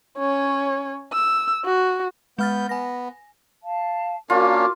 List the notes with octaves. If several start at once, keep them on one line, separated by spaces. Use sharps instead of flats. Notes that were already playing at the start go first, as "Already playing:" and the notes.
C#4 C#5
E6
F#4
G#3 B3 F6 G6 A6
B3 G#5 A#6
F5 A5
A#3 C#4 D4 F4 F#4 A#4 D6